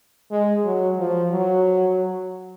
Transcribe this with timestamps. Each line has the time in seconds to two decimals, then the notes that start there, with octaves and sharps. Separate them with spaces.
0.32 G#3
0.65 F#3
0.99 F3
1.32 F#3